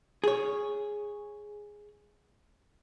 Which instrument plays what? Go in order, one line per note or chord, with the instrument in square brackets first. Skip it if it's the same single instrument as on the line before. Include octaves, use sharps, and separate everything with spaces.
[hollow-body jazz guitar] G#4 C#5